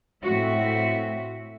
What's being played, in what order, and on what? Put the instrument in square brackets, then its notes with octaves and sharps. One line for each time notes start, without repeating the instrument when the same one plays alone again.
[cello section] A2 C4 F#4 E5